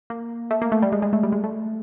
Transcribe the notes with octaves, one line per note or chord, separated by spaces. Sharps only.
A#3
A3
A#3
A3
G3
G#3
G#3
A3
G3
G#3
A3